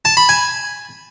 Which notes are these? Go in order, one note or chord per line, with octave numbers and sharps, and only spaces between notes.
A5
B5
G#5